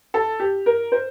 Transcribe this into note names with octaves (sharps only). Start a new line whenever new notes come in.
A4
G4
A#4
C5